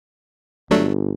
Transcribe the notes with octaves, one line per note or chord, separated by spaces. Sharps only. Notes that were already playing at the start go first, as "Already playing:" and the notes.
G1 F#3 A3 D4